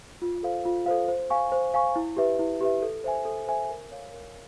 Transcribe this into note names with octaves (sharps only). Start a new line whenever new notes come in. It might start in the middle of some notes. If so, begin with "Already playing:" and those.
F4
A4 C5 F5
F4
A4 C5 F5
C5
F5 G#5 C#6
C5
F5 G#5 C#6
E4
G4 B4 E5
E4
G4 B4 E5
A4
C5 E5 G#5
A4
C5 E5 G#5
A#4
C#5 F5
A#4